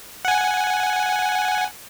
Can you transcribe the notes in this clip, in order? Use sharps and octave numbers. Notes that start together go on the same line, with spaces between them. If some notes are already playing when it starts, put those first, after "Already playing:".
F#5 G#5